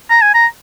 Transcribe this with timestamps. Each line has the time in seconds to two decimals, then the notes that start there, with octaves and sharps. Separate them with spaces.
0.10 A#5
0.22 G#5
0.34 A#5